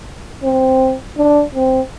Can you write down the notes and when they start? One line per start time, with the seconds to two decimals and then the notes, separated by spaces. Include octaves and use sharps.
0.43 C4
1.17 D4
1.55 C4